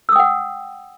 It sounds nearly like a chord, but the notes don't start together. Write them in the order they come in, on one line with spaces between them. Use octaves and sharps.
E6 D#6 G5 F#5